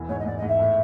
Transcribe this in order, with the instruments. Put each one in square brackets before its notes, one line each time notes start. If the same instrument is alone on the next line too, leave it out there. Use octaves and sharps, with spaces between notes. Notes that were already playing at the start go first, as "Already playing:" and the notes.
Already playing: [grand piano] E1 E3
[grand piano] G#2 [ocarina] C#5
[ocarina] D#5
[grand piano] G#2 [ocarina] D5
[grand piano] G#2 [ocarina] D#5
[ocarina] E5
[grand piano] A2